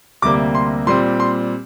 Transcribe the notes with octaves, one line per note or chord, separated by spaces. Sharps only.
D2 C3 G3 A#3 D6
C6
A#2 G3 C4 C6
C6